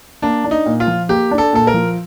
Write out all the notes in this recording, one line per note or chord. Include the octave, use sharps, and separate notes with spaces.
A#3 D4
D4
D#4
A#2
F4
F3
A#3 G4
D4
A4
A#2 A4
A#4
F3